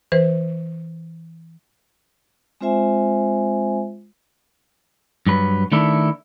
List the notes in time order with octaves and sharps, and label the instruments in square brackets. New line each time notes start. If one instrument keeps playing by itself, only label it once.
[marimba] E3 B4 C5
[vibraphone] G#3 C4 F4 C5 E5 G#5
[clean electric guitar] G2 F#3 B4
D#3 A3 D4 E4